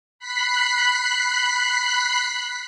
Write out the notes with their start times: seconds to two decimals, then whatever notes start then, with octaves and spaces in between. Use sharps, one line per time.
0.19 B5 F#6 B6 C7